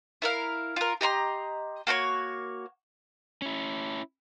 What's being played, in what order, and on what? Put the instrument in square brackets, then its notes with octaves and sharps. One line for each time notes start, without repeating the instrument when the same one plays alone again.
[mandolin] E4 A#4 F5
F4 A#4
G4 D#5 A#5 C6
A#3 F#4 B4 C#5
[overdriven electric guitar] C#4 E4